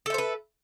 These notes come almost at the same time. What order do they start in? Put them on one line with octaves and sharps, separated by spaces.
A4 E5 C5 B4